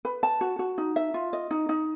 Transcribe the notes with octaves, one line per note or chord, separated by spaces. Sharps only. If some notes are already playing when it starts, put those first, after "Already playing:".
B4
A5
F#4
F#4
D#4
E5
F4
D#5
D#4
D#4